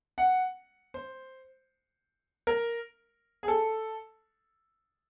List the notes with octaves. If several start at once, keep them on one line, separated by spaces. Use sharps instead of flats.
F#5
C5
A#4
G#4
A4